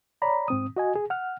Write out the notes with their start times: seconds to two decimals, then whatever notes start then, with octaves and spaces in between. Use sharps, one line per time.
0.22 C#5 D5 A#5 B5
0.48 G#2 C4 D#6
0.77 F#4 D#5 G#5
0.95 G#4
1.10 F#5 F6